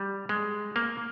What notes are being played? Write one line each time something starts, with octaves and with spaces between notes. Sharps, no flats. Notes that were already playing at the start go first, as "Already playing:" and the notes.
Already playing: G3
G#3
A#3